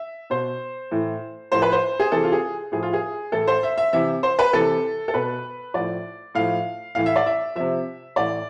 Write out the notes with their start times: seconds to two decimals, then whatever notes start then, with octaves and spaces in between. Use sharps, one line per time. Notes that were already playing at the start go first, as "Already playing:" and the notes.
Already playing: E5
0.30 B2 C5
0.91 A2 E3
1.52 A2 F3 C5
1.62 B4
1.72 C5
2.00 G#4
2.12 C3 E3 A4
2.24 F4
2.32 G#4
2.72 A2 F3 G#4
2.83 F4
2.93 G#4
3.32 A2 E3 A4
3.47 C5
3.63 E5
3.78 E5
3.93 C3 E3 E5
4.23 C5
4.39 B4
4.53 C3 E3 A4
5.08 A4
5.14 B2 B4
5.74 A2 F3 D5
6.35 A2 F3 F5
6.95 A2 E3 F5
7.06 E5
7.16 D5
7.26 E5
7.56 C3 F3 E5
8.16 A2 E3 D5